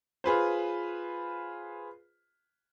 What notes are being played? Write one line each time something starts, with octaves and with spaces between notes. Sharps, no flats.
F4 G#4 B4 C5